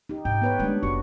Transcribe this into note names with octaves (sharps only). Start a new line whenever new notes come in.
D#4 G4
G#2 G5
B3 B4 C#5
G3 G#3 A#3 D4
F#1 F#4 C#6